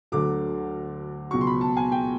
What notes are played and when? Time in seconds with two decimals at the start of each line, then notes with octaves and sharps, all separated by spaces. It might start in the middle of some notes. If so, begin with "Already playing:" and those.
0.12 D2 D3 F#3 D6
1.31 C#2 B2 F#3 C#6
1.41 C6
1.47 B5
1.61 A5
1.77 G#5
1.92 G5